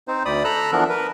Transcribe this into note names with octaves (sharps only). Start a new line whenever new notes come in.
C4 D#4 C5
D2 D5 B5 D#6
A4 A#5 B5 E6 F#6
E3 F3 B3 D4 A#4
A#4 B4